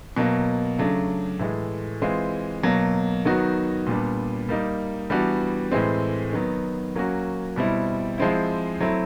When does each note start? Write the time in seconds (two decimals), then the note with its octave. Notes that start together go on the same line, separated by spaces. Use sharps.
0.17 B2 F#3 A#3
0.78 C#3 F#3 A3 D4
1.40 A2 E3 G#3
2.02 E3 G#3 C4 F4
2.63 B2 F#3 A#3
3.25 D#3 F#3 B3 D#4 F#4
3.87 A#2 G3 B3 D4
4.49 G3 A#3 D#4
5.10 E3 G3 B3 D4 F#4
5.71 A2 E3 G#3 C4
6.33 D#3 F#3 B3
6.95 F#3 A#3 C#4 F#4
7.56 B2 G3 C4 E4
8.18 F3 G#3 C4 E4
8.80 F#3 A3 C4 E4